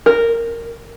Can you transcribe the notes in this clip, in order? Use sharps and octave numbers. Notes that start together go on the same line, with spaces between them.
A#4